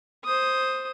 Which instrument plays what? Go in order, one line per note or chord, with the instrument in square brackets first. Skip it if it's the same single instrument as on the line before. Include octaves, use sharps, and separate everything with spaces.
[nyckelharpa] C5 D#6